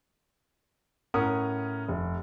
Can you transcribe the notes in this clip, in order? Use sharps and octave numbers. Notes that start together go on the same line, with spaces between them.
A2 C#4 A#4 F#5 D#6
F1